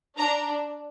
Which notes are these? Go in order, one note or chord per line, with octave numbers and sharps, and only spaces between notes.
D4 A#5